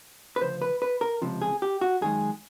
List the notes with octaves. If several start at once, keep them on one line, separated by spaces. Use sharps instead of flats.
B4
D2 C#3 F3 C5
B4
B4
A#4
C#2 C3 F3
G#4
G4
F#4
F#2 D#3 G#3 G#4